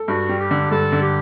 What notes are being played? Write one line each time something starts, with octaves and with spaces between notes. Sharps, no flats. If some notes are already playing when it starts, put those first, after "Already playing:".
Already playing: A4
G2 F#4
G3
G4
D3
G2 A4
D3
G4